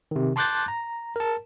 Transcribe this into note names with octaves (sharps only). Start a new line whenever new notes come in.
C3 D#3
A5 C6 D6 F#6 G6 A6
A#5
A#4 A5